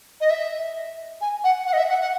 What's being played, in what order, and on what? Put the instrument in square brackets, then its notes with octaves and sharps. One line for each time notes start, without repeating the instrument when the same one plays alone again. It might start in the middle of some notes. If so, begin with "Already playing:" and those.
[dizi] D#5
E5
G#5
F#5
F#5
D#5
E5
F#5
F#5